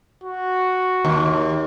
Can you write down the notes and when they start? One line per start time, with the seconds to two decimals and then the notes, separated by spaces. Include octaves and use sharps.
0.24 F#4
1.05 D#2